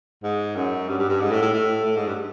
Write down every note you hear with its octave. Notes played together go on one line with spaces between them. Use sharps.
G#2
F#2
G2
G2
G2
G#2
A2
A2
A2
A2
G#2
G2